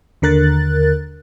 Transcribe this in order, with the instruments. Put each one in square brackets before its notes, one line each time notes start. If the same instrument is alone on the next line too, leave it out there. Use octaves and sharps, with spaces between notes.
[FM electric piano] D#2 D3 A#4 F#6 A6